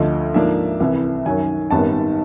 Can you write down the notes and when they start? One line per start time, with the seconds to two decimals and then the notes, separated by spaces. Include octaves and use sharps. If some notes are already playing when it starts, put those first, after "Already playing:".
Already playing: D2 D3 F3 D#5
0.34 G#2 F3 A#3 D4 E5
0.80 C2 C3 E3
1.25 F#2 D#3 F#3 G#5
1.71 G#1 F#2 D#3 G3 B3 A5